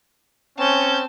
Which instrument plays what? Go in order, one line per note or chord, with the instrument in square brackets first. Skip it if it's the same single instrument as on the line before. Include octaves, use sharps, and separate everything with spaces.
[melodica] C4 [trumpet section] C#4 [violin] A5 G6